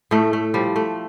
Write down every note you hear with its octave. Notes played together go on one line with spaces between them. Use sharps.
A2 A3
A3
F3 G3
A3